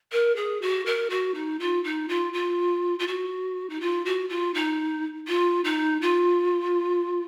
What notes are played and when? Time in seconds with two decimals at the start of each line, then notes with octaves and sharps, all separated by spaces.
0.12 A#4
0.36 G#4
0.62 F#4
0.86 A#4
1.10 F#4
1.34 D#4
1.60 F4
1.84 D#4
2.08 F4
2.33 F4
2.99 F4
3.07 F#4
3.70 D#4
3.80 F4
4.05 F#4
4.29 F4
4.54 D#4
5.28 F4
5.64 D#4
6.02 F4